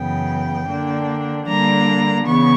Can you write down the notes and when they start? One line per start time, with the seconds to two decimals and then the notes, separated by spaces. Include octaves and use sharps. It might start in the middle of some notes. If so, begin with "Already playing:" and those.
Already playing: F#2 C#3 E3 B3 G5
0.69 D3 A#3 D4
1.47 D3 G3 A#3 D4 A#5
2.25 C#3 E3 B3 C#6